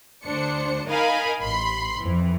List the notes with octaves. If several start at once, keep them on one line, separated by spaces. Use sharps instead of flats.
D2 D4 C5 C#7
D#4 A#4 D#5 F5 G#5 B5
A1 B5 C6 C7
F2 E3